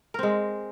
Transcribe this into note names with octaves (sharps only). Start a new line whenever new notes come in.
G#3 C4 A#4